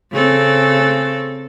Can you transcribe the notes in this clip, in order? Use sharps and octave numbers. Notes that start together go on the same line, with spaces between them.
C#3 C4 A4